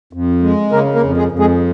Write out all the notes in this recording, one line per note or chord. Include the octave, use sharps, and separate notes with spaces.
F2
G#3
C#3 A#3 A#4
A#3 A#4
F2
G#3 G#4
F2
G#3 G#4